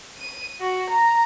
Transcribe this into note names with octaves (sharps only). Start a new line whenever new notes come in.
D#7
F#4
A#5